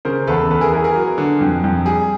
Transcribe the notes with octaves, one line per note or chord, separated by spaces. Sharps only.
C#3 A#4 C5
E2 A4 B4
E2 A4 B4
G#4 A#4
E3 G#4 A#4
G#4 A#4
F#3
D3
F2
F2
G3 G#4